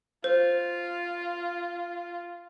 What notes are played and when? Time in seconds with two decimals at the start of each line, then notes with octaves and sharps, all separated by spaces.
0.24 F4 C5